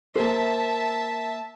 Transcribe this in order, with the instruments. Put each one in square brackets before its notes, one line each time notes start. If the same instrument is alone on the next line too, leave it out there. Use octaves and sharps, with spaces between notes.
[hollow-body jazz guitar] A#3 C5 [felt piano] A#4 [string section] E5 A5